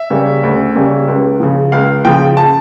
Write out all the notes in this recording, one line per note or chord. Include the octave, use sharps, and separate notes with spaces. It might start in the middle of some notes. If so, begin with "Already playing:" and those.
Already playing: E5
C#3 G3 A#3 C#4
D2
C#3 G3 A#3 C#4
C#2
C#3 F3
C#2 F5
C#3 F3 G5
A5